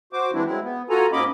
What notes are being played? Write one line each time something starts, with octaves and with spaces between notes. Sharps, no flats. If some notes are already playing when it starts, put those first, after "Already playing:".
F#4 C5 D6
E3 G3 G#3 C4 D4 E4
F#3 G#3 C4 E4
B3
F4 F#4 A4 G#5 A#5
G#2 A#3 C#4 D#5 B5 D6